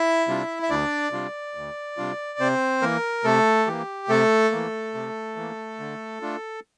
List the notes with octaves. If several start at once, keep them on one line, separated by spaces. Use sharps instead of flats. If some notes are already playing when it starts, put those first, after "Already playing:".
Already playing: E4 E5
C3 G3 D4 F4
E5
D2 D4 D5
C3 G3 D4 F4
D2
C3 G3 D4 F4
C3 C4 C5
E3 A#3 A#4
C3 A3 A4
E3 A#3 G4
C3 A3 A4
E3 A#3
C3
E3 A#3
D3
A3 D4 F4